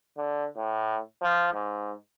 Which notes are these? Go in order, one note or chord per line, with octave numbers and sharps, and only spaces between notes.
D3
A2
F3
G#2